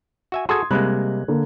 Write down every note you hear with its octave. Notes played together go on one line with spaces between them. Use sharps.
F#4 E5 G#5
F#4 G#4 A4 C6 D#6 G#6
C3 G3 G#3 A#3 B5 F#6
D3 A#3